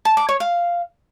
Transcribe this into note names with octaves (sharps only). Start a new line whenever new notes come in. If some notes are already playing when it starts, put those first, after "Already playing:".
A5
D6
C#5
F5